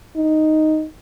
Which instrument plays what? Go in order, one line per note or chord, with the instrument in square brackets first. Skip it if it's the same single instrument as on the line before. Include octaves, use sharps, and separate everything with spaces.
[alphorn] D#4